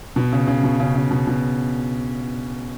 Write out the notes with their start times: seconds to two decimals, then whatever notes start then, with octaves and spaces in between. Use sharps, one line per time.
0.16 B2
0.33 C#3
0.48 C#3
0.63 B2
0.80 C#3
0.95 C#3
1.11 B2
1.27 B2